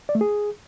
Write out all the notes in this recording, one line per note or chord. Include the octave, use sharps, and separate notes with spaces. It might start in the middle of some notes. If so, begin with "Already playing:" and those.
D5
A3
G#4